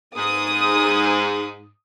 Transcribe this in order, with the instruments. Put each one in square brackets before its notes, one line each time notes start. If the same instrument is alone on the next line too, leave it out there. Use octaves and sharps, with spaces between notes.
[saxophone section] G#2 [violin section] D#6